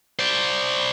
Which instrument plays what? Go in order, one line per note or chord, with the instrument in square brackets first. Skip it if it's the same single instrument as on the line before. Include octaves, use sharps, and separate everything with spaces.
[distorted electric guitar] C5 D5